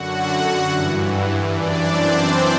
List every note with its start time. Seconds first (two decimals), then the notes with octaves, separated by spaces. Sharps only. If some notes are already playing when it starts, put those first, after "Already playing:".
Already playing: F#2 D3 F#4 F#5
0.68 G2 E3
1.52 F#2 E3 D4 D5
1.94 C4 C5